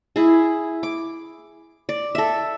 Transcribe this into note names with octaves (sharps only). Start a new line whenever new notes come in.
E4 G#4
D6
D5
A4 E5